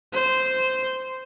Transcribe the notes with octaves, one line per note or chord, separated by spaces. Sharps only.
C5